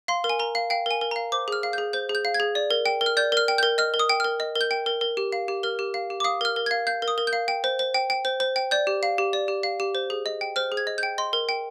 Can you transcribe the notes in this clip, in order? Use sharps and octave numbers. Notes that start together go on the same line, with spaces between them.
F5 C6
A#4
G#5
A#4 A#5
F5
F5 G5
A#4 G#5
A#4
F5 A#5
C5 D6
G#4 F6
F5
G#4 G6
C5 G6
G#4
G6
F5
G#6
G#4
D5
A#4
G5
A#4
F6
D5 G6
A#4 F6
G5
A#4 G6
D#5 F6
A#4
D#6
G5
A#4 F6
D#5
A#4
G6
G5
A#4
A#4
G4
F5
G4
A#4 F6
G4
F5
G4
D6
F5 D#6
A#4 F6
A#4
F5 G#6
F5 G6
A#4
D#6
A#4
G6
F5
G5
C5
C5
G5
G5
C5
C5
G5
D5 G6
G4
F5
G4
D5
G4
F5
G4
C5
G#4
D#5
G5
C5 F6
G#4
G#6
D#5
G5 G6
D#5 C6
A#4
G5